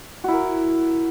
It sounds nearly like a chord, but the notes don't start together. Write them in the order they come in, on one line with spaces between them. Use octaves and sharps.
F#4 E4 A#4